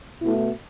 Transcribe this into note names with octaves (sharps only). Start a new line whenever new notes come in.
B2 A3 E4